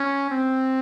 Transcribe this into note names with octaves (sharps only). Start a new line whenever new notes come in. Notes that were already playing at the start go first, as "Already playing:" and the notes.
Already playing: C#4
C4